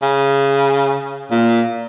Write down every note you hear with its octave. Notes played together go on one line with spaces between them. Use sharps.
C#3
A#2